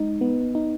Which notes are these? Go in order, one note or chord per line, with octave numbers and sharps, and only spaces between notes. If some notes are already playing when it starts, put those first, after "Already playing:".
Already playing: G#3 D#4
B3
D#4